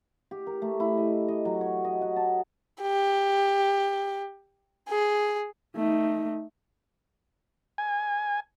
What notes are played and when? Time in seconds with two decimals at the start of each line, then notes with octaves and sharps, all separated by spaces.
0.31 G4
0.47 A#4
0.62 A3
0.80 E4
0.97 D#5
1.28 D#5
1.45 F#3
1.61 C#5
1.85 D#5
2.01 F#5
2.16 A5
2.82 G4
4.89 G#4
5.75 A3 D#4
7.78 G#5